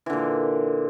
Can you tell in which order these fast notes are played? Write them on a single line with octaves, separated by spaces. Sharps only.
E3 D3 A#2